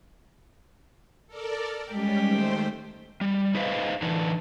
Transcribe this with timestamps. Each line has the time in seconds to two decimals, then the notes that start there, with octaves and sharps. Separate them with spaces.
1.27 A4 A#4 D5
1.92 G3 G#3 C#4 G4
2.22 D#3 A3 C5
3.21 G3
3.54 D#4 B4 C5 D#5 F5
4.02 E3 D4 D#4